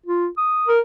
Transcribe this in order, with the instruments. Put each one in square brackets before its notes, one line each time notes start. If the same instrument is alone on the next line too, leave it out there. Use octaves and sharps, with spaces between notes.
[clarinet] F4
D#6
[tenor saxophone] A#4